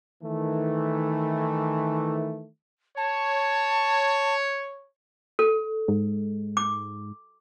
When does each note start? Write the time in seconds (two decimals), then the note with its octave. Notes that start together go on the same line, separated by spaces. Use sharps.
0.23 D#3 E3 A3
2.97 C#5 A5
5.39 A4
5.88 G#2
6.57 D6